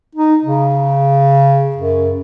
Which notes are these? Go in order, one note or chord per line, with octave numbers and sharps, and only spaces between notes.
D#4
C#3
F#2